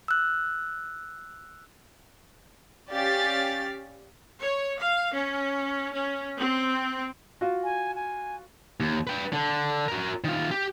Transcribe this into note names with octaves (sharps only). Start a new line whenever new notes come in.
E6 F#6
C#4 G4 D5 F5 A6
C#5
F5
C#4
C#4
C4
F4 F#4
G#5
G#5
D#2
B4 G5
D3
F#4 A#4
D#3 F4
G4